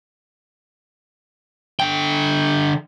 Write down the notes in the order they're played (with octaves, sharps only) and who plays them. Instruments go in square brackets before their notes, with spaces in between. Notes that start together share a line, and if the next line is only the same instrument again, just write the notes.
[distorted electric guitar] D3 G5